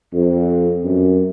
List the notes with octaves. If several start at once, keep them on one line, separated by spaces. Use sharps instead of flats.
F2
F#2